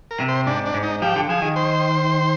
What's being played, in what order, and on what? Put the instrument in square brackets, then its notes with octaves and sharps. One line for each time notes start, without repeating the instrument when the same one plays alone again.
[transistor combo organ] A#4
[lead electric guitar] C3
[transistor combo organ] C5
[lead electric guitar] G#2 [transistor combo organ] D4
[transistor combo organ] D4
[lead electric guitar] G#2
[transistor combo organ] D#4
[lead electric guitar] F3 [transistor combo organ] G4
[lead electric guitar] D3
[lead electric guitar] F3 [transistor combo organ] G#4
[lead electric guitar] D#3
[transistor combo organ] C5